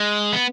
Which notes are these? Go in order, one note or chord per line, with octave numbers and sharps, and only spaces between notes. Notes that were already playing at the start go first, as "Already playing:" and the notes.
Already playing: G#3
B3